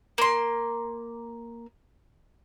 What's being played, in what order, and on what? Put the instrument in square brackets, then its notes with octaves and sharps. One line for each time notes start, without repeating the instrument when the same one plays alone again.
[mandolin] A#3 C6